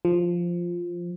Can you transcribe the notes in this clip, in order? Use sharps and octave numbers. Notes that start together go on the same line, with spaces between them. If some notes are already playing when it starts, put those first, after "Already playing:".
F3